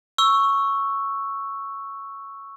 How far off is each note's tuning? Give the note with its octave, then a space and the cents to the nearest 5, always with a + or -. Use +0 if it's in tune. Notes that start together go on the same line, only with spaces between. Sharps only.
C#6 +0 E6 +0